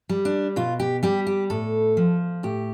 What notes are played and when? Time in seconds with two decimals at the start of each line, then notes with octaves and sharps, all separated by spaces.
0.09 G3
0.25 D4
0.56 B2 F4
0.80 G4
1.03 G3 G4
1.27 G4
1.50 A2 A4
1.97 F3
2.43 A2 G4